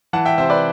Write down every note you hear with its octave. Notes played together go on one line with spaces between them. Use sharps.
E3 F#5 A5
E5 G5
C3 C5 E5
B4 D5